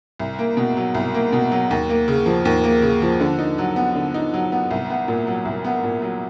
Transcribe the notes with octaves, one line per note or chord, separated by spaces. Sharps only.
C2
A#3
B2
F#3
C2
A#3
B2
F#3
D#2
A#3
C#3
F3
D#2
A#3
C#3
F3
D3
D#4
F#3
B3
D3
D#4
F#3
B3
C2
B3
A#2
F#3
C2
B3
A#2
F#3